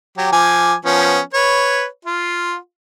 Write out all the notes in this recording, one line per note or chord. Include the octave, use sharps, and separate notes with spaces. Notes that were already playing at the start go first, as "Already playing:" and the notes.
F#3 G4
F3 G#5 D6
F3 B3 C#4
B4 C#5
F4